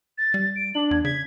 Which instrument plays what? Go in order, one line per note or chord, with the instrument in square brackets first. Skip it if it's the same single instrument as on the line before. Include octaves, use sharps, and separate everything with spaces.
[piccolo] A6
[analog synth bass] G3
[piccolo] D7
[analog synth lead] D4 [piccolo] F#7
[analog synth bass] E2 [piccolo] G#6
[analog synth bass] C#3 [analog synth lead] G#6 [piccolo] B6